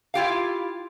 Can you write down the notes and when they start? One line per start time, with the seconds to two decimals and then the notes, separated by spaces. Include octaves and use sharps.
0.14 E4 F4 G4 F5